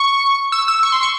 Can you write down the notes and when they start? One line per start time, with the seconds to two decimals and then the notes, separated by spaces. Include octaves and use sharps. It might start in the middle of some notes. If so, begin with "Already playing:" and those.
Already playing: C#6
0.52 E6
0.68 E6
0.83 C#6
0.92 C6
1.03 C#6